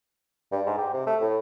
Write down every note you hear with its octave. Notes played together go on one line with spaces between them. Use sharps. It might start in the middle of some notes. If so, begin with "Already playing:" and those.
G2
G#2
G4
C3
A3
A2